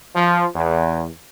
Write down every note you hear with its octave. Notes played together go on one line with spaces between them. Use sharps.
F3
E2